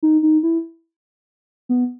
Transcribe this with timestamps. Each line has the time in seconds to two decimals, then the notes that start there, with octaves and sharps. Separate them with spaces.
0.03 D#4
0.23 D#4
0.43 E4
1.69 B3